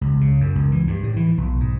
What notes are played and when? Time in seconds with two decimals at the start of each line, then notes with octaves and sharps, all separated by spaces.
0.01 C#2
0.21 C#3
0.41 F#2
0.55 C#2
0.72 E3
0.87 G2
1.03 A2
1.16 E3
1.38 B1
1.60 G#2